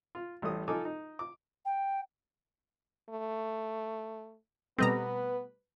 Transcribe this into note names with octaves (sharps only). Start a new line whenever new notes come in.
F4
A1 G3 A3 D#6
F3 D#4 F4 A4 G#5 D6
D#4
D6
G5
A3
B2 G3 A3 B3 C4 B4 D#5 A#5